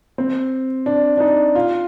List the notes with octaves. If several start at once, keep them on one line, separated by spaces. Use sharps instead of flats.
C4
D4
D4
D#4
F4